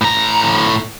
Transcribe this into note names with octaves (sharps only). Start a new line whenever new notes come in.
A2 A#5